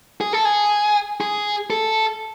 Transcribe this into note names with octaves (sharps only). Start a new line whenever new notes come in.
G#4
A4
G#4
G#4
A4